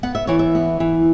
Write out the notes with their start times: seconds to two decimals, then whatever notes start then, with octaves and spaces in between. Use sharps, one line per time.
0.03 B3 F#5
0.15 E5
0.27 E3 C#5
0.39 E5
0.55 B3
0.80 E3